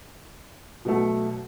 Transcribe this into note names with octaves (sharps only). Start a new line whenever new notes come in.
B2 F#3 A3